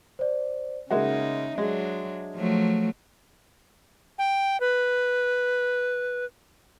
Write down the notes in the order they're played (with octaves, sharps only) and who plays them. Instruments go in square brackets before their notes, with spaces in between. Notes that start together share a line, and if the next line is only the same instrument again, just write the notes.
[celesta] C5 D5
[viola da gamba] C#3 D#4 [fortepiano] G#3 A#3 F#4 [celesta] E5
[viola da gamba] F#3 D4 [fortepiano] G#3
[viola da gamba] F3 F#3 A3
[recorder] G5
B4